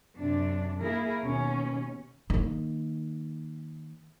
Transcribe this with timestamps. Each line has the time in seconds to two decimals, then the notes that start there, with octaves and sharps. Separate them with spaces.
0.17 F#2 C3 D4
0.80 A#3 E4 G#4 A#4
1.21 D#2 B2 C#4
2.30 D#3 A#3